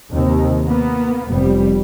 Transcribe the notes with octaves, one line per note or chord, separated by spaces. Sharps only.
D#2 C3 D#3
A#3 B3
F1 G3